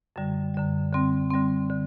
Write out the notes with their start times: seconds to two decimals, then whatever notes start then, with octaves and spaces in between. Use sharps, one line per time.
0.16 F#2 D3 G3
0.54 F#2 D3 G3
0.93 D3 G3 C4
1.30 D3 G3 C4
1.70 D3